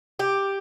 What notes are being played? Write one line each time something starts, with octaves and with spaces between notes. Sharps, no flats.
G4